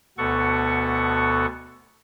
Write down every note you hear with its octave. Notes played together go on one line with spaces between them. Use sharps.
D2 B2 B3 A4 F#5 C#6